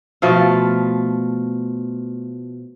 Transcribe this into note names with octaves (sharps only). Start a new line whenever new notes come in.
B2 F3 A3 F5